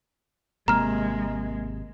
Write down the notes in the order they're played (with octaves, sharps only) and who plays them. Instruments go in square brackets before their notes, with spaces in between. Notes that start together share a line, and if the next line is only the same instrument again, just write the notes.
[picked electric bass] G#1 C3 [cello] G#3 [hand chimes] A#3 [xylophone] A#5 F6